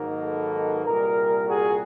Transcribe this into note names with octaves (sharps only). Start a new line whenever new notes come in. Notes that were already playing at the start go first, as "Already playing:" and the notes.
Already playing: G#2 D#3 F#3 A#3
A4 B4
C2 A#2 G3 G#4 A#4
F#4 G#4